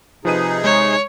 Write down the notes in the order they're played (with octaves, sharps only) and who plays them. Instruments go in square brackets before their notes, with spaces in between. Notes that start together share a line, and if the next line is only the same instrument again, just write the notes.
[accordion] C3 D#4 G#4 [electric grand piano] F3 B4 D#7
[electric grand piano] G#3 [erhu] C#5